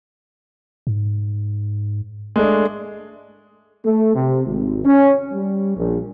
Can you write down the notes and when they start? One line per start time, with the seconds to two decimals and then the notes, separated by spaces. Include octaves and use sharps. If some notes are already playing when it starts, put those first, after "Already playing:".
0.87 G#2
2.36 G#3 A3 D4
3.84 A3
4.15 C3
4.46 G#1
4.85 C#4
5.31 G3
5.77 A#1